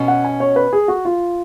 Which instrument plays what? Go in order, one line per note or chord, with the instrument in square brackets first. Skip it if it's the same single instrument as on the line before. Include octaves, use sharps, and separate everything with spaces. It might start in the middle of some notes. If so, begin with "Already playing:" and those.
Already playing: [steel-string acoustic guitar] B2 C#4
[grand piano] F#5
G#5
C#5
B4
G#4
F#4
F4